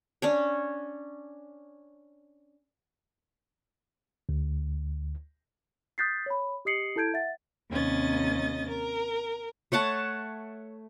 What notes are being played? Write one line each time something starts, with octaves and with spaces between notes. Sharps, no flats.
C#4 D4 C#5
D2
D#6 F#6 G6 A6 B6 C7
C#5 B5
G4 D#5 D#6 C7 C#7 F#7
E4 A4 A5 G6 G#6 D7
E5 F#5 A6
D#2 C3 C#4 D#5 A6
A#4
A3 C#5 F#5 A5